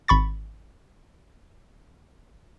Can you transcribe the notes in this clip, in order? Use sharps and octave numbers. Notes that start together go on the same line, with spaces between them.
G#1 B5 C#6 A6